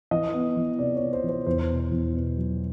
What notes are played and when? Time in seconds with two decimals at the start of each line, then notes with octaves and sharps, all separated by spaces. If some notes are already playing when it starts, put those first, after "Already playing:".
0.11 E3 D#5
0.34 B3
0.56 E3
0.79 C3 D5
0.96 C#5
1.01 C3
1.13 C5
1.24 E3
1.29 C5
1.47 E2 C5
1.69 B2
1.92 E2
2.14 B2
2.37 F#3